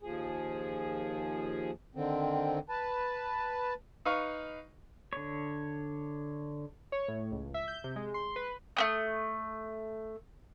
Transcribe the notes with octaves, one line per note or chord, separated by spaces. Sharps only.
D#2 F3 G#4
D3 D#3 C4
B4 A5
D#4 B4 F5 C#6
D3 C#5
C#5
A2
C#2
E5
G6
C3
G#3
C6
B4
A3 B3 D#6